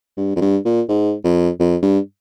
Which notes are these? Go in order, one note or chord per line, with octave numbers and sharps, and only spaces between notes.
G2
F2
G2
A#2
G#2
F2
F2
G2